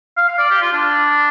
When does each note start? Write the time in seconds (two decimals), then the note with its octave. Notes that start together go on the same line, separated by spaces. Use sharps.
0.17 F5
0.28 F5
0.38 D5
0.50 G4
0.61 F4
0.73 D4